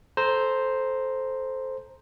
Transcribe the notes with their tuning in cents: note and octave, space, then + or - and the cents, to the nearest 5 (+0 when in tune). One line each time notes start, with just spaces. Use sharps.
A4 -15 C5 +0 A#5 +0